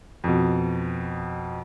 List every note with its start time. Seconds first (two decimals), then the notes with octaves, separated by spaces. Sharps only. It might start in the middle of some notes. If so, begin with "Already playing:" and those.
0.24 F2 B2